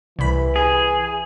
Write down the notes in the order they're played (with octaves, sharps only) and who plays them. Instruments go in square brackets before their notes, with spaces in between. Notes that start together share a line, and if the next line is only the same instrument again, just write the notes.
[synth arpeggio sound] C2 B5 [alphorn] E3
[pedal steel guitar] G#4 [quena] G#5